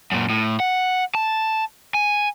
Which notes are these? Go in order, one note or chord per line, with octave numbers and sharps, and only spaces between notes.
F#2 A#2
A2
F#5
A5
G#5